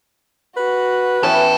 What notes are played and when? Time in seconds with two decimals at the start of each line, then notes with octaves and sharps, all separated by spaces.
0.57 F#4 B4
1.23 E3 B3 C#4 A4 G5